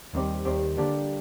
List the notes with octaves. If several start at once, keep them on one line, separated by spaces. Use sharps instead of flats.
D#2 D#3 G3 C4 G4
D#2 D#3 G3 C4 G4
D3 G3 A#3 D4 G4